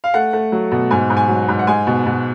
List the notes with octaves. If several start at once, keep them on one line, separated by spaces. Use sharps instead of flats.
F5
A3 F#5
A3
F#3
B2
G#2 G#5
G#2
G#5
F#3
G#2
F#5
G#3 G#5
B2
B2